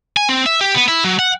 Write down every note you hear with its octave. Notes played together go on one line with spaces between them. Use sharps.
G#5
C4
E5
G4
B3
E4
F#3
F#5